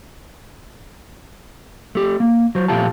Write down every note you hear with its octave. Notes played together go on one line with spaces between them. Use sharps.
A3 G4
A#3
F#3 C5
A#2 F3 A3 F4 G4 A5